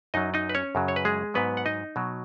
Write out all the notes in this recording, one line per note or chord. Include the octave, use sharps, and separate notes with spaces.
F#2 F#3 D#4 D#5
D#4 D#5
B4
C#4 C#5
F#2 C#3 F#3
C#5
B4
G#3 G#4
G#2 F#3 B3 B4
F#5
D#4 D#5
B2 F#3